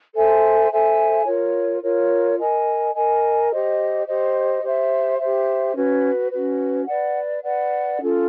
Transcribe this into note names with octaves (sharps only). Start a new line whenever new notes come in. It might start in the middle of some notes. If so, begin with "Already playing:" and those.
A4 C5 E5 G#5
A4 C5 E5 G#5
F4 A#4 C#5
F4 A#4 C#5
A#4 D#5 G#5
A#4 D#5 G#5
G4 C5 D#5
G4 C5 D#5
G4 C5 E5
G4 C5 E5
C#4 F#4 B4
C#4 F#4 B4
B4 D5 F#5
B4 D5 F#5
C#4 F4 A4